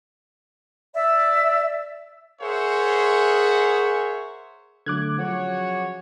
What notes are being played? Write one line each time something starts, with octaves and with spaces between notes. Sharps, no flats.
D5 E5 E6
G#4 A#4 C5 C#5 E5 F#5
D3 F#3 A3 D6 F#6 G#6
C#3 F3 F#3 F#4 C#5